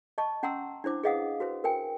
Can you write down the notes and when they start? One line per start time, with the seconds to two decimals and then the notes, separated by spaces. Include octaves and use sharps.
0.18 D#5 A5 C#6
0.43 C#4 F#5 A#5 C6 E6
0.84 D4 E4 C5 D6
1.04 G#4 B4 D#5 F5 F#5 D#6
1.40 F#4 B4 C5
1.64 A#4 B4 G5 G#5